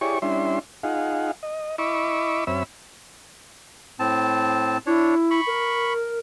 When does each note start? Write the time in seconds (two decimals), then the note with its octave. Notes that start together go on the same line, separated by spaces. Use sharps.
0.01 E4 G4 G#4 C#5 D5 C#6
0.22 G3 C#4 D4 E4 E5 C6
0.83 D#4 F4 G#4 F5 F#5
1.43 D#5
1.78 E4 D#5 B5 C#6 D6 E6
2.47 F#2 C4 C#5 E5 B5 E6
3.99 A2 C4 A5
4.87 D4 E4 C#5
5.31 B5 C#6
5.47 A#4